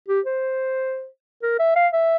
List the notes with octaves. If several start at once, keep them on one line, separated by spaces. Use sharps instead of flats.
G4
C5
A#4
E5
F5
E5